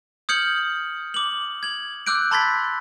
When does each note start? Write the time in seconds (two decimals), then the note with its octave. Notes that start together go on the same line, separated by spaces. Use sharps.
0.29 D#6 F6 G6 G#6 C#7 F#7
1.14 D6 F#7
1.63 G#6 F#7
2.07 D6 E6 F#6 G6 D7
2.31 A5 B5 C6 G#6 A6 B6